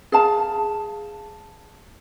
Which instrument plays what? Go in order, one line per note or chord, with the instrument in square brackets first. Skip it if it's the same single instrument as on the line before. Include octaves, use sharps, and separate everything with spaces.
[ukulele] G#4 F5 A5